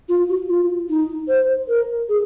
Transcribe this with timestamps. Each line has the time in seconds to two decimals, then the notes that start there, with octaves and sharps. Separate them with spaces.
0.09 F4
0.29 F#4
0.49 F4
0.89 D#4
1.28 C5
1.68 A#4
2.09 G#4